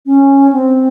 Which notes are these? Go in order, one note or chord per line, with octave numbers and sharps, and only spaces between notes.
C#4
C4